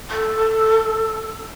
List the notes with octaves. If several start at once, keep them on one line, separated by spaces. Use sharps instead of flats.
A4